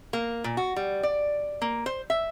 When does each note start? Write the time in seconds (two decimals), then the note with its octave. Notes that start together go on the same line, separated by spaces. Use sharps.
0.13 A#3
0.44 A#2
0.57 F#4
0.76 G3
1.03 D5
1.62 A#3
1.86 C5
2.10 E5